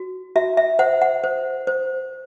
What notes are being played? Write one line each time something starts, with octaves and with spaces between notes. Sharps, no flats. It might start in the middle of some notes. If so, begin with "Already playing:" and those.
Already playing: F#4
F#4 E5
E5
C5 F#5
F#5
C5
C5